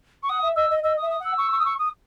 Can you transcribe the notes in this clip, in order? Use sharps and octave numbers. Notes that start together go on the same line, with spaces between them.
C#6
F#5 D#6
E5
D#5 E6
D#5
D#5 E6
D#6
E5
D#6
F#5
E6
C#6
C#6
D#6
C#6
D#6